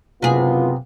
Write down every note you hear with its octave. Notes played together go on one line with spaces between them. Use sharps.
F#1 C3 B3 F4 G#4